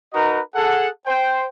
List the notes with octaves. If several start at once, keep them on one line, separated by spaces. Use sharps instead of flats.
D#4 F#4 A#4 B4 D#5 A#5
G#4 A4 F#5
C5 G5